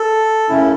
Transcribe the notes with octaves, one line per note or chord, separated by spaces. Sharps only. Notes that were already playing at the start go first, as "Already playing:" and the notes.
Already playing: A4
F#2 C#3 A3 C#4 E4